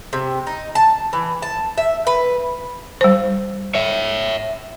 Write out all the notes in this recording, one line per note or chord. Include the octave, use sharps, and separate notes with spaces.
C3
D#4
A5
E3
A5
E5
B4
G3 C5
C#5 E5